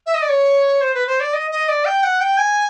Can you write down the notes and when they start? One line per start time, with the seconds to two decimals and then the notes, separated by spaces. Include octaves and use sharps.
0.06 E5
0.14 D#5
0.22 D5
0.29 C#5
0.81 C5
0.94 B4
1.07 C5
1.20 D5
1.33 D#5
1.51 D#5
1.68 D5
1.85 G5
2.03 F#5
2.21 G5
2.37 G#5